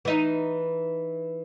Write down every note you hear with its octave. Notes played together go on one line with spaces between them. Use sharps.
E3 D#4